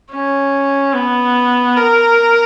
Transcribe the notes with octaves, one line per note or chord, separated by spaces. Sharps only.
C#4
B3
A#4